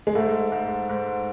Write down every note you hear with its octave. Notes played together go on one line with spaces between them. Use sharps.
G#3
G#2 A3
G#2
G#2